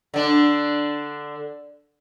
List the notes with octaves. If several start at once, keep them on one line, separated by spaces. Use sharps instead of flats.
D3 D4